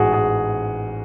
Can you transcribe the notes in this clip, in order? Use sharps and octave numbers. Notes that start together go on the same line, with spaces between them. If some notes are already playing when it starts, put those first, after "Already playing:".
Already playing: A1 G#2 F#4 G#4
G#4